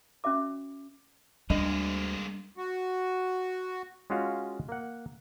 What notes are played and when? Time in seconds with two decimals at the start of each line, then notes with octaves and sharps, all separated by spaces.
0.24 C#4 F#4 E5 D6
1.50 D2 G3 G#3 A#3 D4
2.57 F#4
4.10 G#3 C#4 F4 F#4 F5
4.69 A#3 F#5